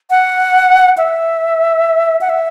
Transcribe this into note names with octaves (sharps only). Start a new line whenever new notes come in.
F#5
E5
F#5
E5